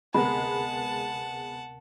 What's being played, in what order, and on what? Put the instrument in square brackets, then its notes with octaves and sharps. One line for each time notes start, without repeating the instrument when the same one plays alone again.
[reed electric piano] D2 C3 A#4 [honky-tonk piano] G#3 B3 [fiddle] F#5 A5 [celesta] B5